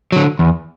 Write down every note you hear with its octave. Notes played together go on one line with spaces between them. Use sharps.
D3 F#3
E2